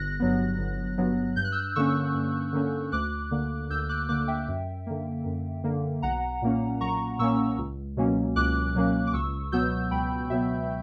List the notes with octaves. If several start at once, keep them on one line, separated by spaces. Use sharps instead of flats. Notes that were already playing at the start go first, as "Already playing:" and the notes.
Already playing: G1 F#6 A#6
G2 F#3 B3
G1
G2 F#3 B3
G2 G6
F#6
E6 G6
D3 A#3 C#4 C#6 E6
G2
D3 A#3 C#4
D2 D6 F#6
D3 A#3
D2 E6 G6
D6 F#6
D3 A#3 D6 F#6
E5 G5
F#2
D3 A#3
F#2
D3 A#3
B1 F#5 A#5
A#2 A#3 C#4
B1 A#5 C#6
A#2 A#3 C#4 C#6 E6
C#2
B2 F#3 A#3 C#4
C#2 D6 F#6
B2 F#3 A#3 C#4
D6
C#2 C#6 E6
B2 F#3 B3 E6 G6
C#2 G5 B5
B2 F#3 B3 E5